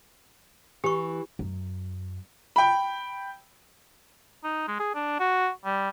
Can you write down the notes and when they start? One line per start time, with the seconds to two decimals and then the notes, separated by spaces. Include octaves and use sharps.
0.84 E3 G4 C#6
1.39 F#2
2.56 G5 B5
4.44 D#4
4.67 G#3
4.79 G#4
4.94 D4
5.19 F#4
5.65 G3